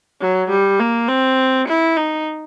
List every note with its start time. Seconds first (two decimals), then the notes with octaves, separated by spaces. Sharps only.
0.21 F#3
0.50 G3
0.79 A#3
1.08 C4
1.68 E4
1.97 D#4